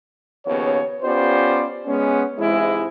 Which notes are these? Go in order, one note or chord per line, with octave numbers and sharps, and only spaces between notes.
D#2 C#3 F3 B3 C#5
B3 C#4 F4 G4 C5 D5
G#3 B3 C#4
G#2 C3 E3 G#3 E4